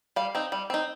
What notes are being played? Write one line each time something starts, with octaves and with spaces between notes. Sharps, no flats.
G3 F5
C4 D#4
G3
C4 D#4